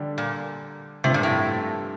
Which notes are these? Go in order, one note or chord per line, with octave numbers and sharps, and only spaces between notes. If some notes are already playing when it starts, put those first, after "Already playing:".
Already playing: D3 G3 D4 G4
A#2
G2 C3 F3 A3 C4
A#2
A2